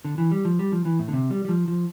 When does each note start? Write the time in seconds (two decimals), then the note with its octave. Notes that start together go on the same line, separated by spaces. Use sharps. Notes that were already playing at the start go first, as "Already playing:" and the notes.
0.05 D3
0.18 E3
0.31 G3
0.45 F3
0.59 G3
0.72 F3
0.85 E3
0.99 A2
1.08 D3
1.13 C3
1.30 G3
1.45 G3
1.49 F3
1.68 F3